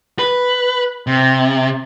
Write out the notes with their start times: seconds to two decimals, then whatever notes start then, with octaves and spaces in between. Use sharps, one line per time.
0.19 B4
1.07 C3